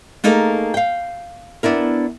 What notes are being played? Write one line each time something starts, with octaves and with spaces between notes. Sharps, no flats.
A3 A#3 D#4 G#4 A#4
F5 G5
B3 D4 E4 A#4